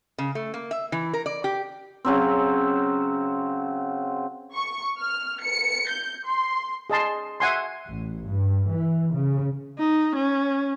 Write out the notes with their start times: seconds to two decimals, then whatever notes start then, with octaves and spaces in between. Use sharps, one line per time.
0.18 C#3
0.35 A3
0.54 A#3
0.71 E5
0.92 E3
1.13 A#4
1.26 D5
1.44 G4
2.05 C#3 F#3 C4
4.53 C#6
4.98 F6
5.41 C#7
5.89 G6
6.25 C6
6.90 G#4 D#5 A5 C6
7.40 E5 F#5 G#5 C6
7.88 A1
8.25 G2
8.68 E3
9.15 C#3
9.78 D#4
10.16 C#4